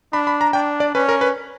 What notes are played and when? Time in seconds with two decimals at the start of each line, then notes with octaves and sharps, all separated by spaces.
0.13 D4 B5
0.27 B5
0.41 A#5
0.53 D4 G5
0.80 D5
0.95 C#4 B4
1.09 A#4
1.21 B4